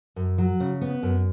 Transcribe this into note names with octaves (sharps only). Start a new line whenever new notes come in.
F#2
F#3
C#3
B3
F#2